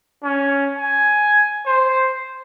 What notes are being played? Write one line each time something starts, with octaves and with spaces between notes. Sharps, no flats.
C#4
G#5
C5